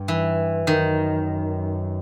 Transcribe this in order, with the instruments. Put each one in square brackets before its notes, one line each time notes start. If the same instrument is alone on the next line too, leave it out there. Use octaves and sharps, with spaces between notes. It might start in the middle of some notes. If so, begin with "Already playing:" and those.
Already playing: [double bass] G2
[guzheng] E3
[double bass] F#2 [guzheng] D#3